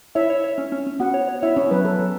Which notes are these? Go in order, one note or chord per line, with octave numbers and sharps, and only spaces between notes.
E4 C#5 E5
C#5
C#5
C#4
C#4
C#4
B3 F#4 F#5
C#5
C#5
E4 C#5 E5
B3 C#4 C#5
F#3 B4
F#3 A4
F#3